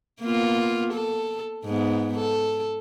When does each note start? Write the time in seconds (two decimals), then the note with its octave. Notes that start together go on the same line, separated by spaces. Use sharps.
0.21 A#3 B3 F4
0.93 A4
1.65 G#2 B3
2.16 A4